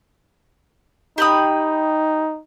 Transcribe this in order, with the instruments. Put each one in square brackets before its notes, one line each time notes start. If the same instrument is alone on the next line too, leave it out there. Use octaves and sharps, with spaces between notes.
[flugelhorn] D#4 [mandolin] G4 B5 D#6